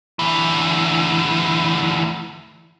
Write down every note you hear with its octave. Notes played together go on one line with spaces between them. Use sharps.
D2 E3